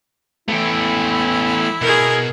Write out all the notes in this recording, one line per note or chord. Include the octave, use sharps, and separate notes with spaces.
E3 A3 B3 E4 G5
B2 G#4 A#4